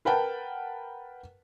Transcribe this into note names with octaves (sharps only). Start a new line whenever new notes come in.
A#4 B4 F#5 G5 A5